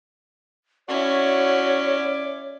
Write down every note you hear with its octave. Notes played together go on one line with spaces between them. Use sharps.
C#4 E4 F#4 C#5 D5